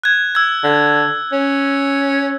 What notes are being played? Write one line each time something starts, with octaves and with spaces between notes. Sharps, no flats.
F#6 G#6
E6 G#6
D3
C#4